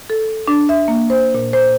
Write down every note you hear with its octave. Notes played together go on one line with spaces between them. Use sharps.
A4
D4
E5
A#3
C5
A#2
C5